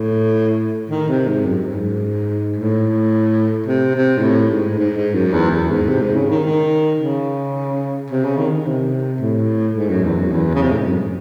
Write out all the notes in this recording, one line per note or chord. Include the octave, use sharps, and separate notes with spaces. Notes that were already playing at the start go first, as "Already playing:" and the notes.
Already playing: A2
D#3
C3
G#2
F#2
G#2
A2
C3
C3
G#2
A2
G#2
G#2
G#2
F#2
E2
E2
G#2
C3
G#2
C#3
D#3
D#3
C#3
C3
C#3
D#3
D#3
C3
A2
G#2
F#2
E2
F#2
E2
C#3
C3
A2
G#2
F#2